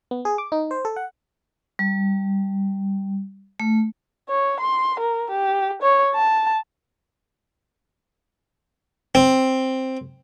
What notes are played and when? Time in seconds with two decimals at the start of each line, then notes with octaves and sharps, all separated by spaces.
0.11 B3
0.25 G#4
0.38 D6
0.52 D#4
0.71 C5
0.85 A4
0.96 F#5
1.79 G3
3.60 A3
4.29 C#5
4.60 C6
4.99 A#4
5.31 G4
5.82 C#5
6.15 A5
9.15 C4